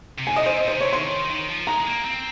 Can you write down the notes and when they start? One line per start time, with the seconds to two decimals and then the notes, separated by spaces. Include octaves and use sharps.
0.18 C3
0.27 G#5
0.31 A#2
0.36 D#5
0.43 C#3 C5
0.53 C3
0.63 A#2
0.68 C5
0.73 C3
0.81 C#5
0.93 D#3 C6
1.30 D#3
1.48 F3
1.67 G#3 A#5
1.80 G#3
1.86 A#3
2.05 C4